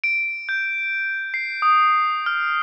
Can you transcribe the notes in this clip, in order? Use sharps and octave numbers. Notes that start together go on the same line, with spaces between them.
D7
G6
C7
D#6
F6